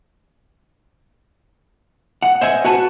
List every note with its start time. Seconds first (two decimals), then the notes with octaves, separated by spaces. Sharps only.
2.22 F#5
2.41 C5 D#5 E5 F#5 G#5
2.65 F#4 B4 F#5 G#5 A5